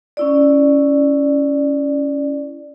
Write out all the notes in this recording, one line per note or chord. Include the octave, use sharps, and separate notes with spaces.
C#4 E4 D5